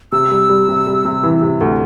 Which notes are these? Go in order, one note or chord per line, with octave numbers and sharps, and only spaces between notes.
C3 E6
G3
G3
C3
G3
C3
E3
C3
D2